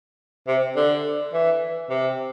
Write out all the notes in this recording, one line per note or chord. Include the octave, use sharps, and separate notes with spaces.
C3
D3
E3
C3